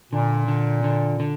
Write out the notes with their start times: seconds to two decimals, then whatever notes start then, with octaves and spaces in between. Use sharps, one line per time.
0.12 A#2 D3
0.48 D3
0.84 D3
1.20 D3